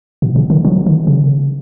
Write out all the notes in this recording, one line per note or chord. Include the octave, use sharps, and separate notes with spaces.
B2
C#3
D#3
F#3
D#3
C#3